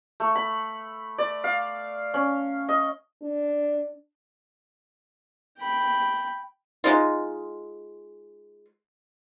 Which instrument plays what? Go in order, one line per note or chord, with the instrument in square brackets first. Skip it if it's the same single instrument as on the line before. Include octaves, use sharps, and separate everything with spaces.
[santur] A3
B5
D5
F5
C#4
D#5
[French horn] D4
[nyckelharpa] G5 B5
[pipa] G#3 D#4 F4